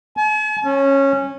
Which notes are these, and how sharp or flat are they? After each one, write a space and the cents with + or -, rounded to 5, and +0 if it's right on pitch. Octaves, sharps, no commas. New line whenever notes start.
G#5 +45
C#4 -15